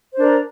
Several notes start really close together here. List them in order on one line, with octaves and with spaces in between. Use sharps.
C5 D4 A#4